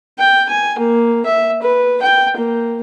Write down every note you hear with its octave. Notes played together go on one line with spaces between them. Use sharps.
G5
G#5
A#3
E5
B4
G5
A#3